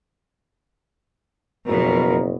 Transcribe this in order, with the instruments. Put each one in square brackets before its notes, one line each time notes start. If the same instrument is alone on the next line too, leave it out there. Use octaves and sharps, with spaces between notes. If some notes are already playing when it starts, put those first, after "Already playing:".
[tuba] F#1 [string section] F2 B2 [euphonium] F#3 [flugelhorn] A#4